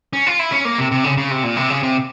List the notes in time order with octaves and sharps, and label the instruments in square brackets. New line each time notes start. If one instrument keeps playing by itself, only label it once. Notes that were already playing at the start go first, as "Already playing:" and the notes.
[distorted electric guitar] C#4
F4
E4
C#4
A#3
C3
C3
C#3
C#3
C3
A#2
C3
C#3
C3